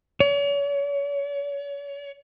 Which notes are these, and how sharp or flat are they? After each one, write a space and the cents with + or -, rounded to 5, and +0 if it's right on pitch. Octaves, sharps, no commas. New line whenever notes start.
C#5 +40